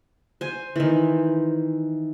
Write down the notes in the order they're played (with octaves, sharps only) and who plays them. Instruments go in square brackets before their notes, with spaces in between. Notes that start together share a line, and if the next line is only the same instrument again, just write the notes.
[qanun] C5 G#5
D#3 E3